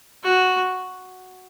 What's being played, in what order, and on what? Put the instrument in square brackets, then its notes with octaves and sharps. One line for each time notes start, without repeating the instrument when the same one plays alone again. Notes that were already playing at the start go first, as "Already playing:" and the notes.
[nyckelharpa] F#4